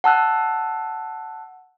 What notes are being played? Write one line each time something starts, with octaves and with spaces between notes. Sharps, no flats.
F#5 A5 E6 F#6